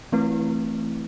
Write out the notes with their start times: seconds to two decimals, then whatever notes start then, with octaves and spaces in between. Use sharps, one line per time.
0.12 E3 A3 C4 E4 B4